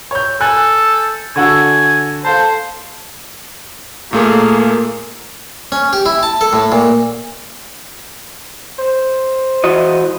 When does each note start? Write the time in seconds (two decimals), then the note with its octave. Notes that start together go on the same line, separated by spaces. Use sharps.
0.11 C#5 G6
0.41 A4 G#5 F#6
1.36 D3 F#4 G#5 E6
2.25 A4 C5 F5 A5
4.13 A#2 A3 A#3 G#4
5.72 C#4
5.93 G4
6.06 E4
6.23 A5
6.41 A4
6.53 A2
6.72 A#2
8.79 C5
9.64 E3 F#4 D#5